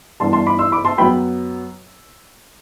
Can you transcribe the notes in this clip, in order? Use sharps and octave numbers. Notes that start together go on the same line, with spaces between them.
G2 E3 B3 D4 A5 C6
A5 C6
B5 D6
C6 E6
B5 D6
A5 C6
F#2 F#3 B3 G5 B5